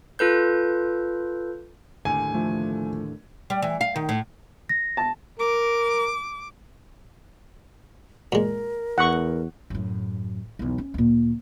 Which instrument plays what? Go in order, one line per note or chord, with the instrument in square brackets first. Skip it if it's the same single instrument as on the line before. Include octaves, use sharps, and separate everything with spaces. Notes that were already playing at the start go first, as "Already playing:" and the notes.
[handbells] F4 A4 B4 G6
[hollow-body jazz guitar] D#2 A2 D3 [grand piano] G#5
[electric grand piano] F3 A3
[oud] G3
E3
F5
D#3
A2
[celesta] A#6
[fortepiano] A5
[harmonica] A#4 [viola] D6
[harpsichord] A#2 G#3 [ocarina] A#4
[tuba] E2 [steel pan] F#5 C#6
[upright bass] F#2 A2
B1 E2
C#4
D2 A#2